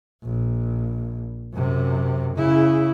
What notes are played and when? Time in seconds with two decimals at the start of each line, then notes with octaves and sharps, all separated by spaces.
0.24 A#1
1.54 F#2 C3
2.36 C#3 E4